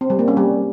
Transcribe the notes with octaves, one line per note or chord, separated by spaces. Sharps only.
C4
G3
A#3
C#4
G3